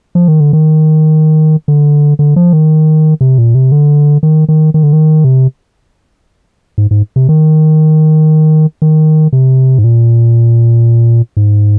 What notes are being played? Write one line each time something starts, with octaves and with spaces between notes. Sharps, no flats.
F3
D#3
D3
D#3
D3
D3
F3
D#3
C3
A#2
C3
D3
D#3
D#3
D#3
D3
D#3
C3
G#2
G#2
C3
D#3
D#3
C3
G#2
A#2
G#2